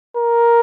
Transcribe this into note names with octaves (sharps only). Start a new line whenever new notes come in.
A#4